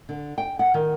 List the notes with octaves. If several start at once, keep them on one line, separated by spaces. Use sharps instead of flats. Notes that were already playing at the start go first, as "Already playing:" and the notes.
D3
G5
F#5
D#3